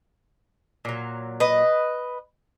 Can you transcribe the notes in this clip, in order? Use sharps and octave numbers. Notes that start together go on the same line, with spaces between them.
A#2 F#3
B4 D#5